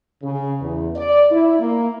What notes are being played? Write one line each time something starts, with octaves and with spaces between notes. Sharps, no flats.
C#3
E2
D5
E4
A#3